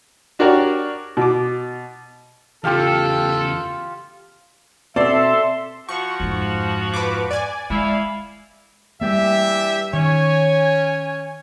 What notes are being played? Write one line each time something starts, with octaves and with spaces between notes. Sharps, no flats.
D4 F#4 G4 A#4 C#5 D5
B2 D6
E2 C#3 F4 G4 A4 F5
B2 C4 A4 D5 E5 A5 C6
F3 F#4 C#6
F2 G#2
B4 D6
D5 G#5
G#3 E4 E5 F5
E3 G3 A3 A#3 D4 G4 E5
D#3 C#4 C#5 G#5